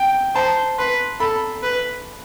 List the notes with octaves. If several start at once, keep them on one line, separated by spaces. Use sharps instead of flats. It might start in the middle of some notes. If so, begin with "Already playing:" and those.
Already playing: G5
C5 A5
B4 C6
A4 B5
B4